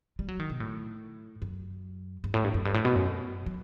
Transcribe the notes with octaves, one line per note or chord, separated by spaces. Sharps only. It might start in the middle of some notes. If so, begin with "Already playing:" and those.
G3
F#3
D#3
B2
A2
F#2
G2
A2
G2
F#2
G2
A2
B2
F#2
F#3